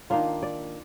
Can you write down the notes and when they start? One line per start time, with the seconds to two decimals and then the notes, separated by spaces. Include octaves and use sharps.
0.10 D#3 A#3 D4 F4 F5
0.43 D5